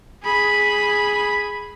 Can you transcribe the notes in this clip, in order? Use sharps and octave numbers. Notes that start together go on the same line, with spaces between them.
G#4 B5